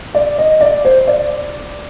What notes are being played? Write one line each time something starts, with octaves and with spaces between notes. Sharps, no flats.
D5
D#5
D5
C5
D5